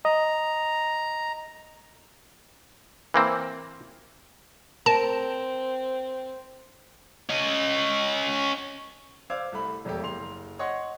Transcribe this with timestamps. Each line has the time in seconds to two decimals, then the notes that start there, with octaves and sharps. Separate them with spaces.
0.05 D#5 A#5
3.14 E3 A#3 C4
4.86 C4 A#4 A5
7.29 C#4 D#5
9.30 C5 D5 F5 D6 E6 G#6
9.52 C2 A3 B5
9.85 E1 F2 A3 G4
10.03 F#1 C6 F7
10.59 C#5 D#5 F#5 C6